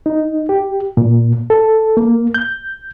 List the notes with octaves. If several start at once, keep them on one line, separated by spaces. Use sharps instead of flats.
D#4
G4
A#2
A4
A#3
G6